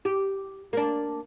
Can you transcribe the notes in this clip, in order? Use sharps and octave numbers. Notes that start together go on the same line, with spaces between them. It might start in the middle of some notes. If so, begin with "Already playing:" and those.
G4
A#3 D4